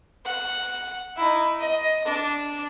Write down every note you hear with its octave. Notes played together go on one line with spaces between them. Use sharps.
F#5
D#4 E4
D#5
D4